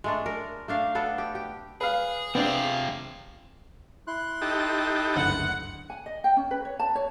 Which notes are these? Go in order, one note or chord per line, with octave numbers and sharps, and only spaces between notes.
G#3 A3 D4
A#4
A3 D4 F5
B3 D4 A4
G4
G4
G#4 B4 F5
C3 B3 C4 D4 F4
E4 C6 F#6
D#4 G4 A4
F#1 D2 G2 F#5
G#5
D#5
G5
C#4
B4
C#5
A5
C#5